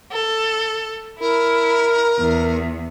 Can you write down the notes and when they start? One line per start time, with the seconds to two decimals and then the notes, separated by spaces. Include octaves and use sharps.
0.11 A4
1.20 E4 A#4
2.19 E2